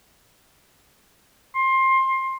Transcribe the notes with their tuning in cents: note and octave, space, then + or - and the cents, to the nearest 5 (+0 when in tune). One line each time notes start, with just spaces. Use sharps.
C6 +20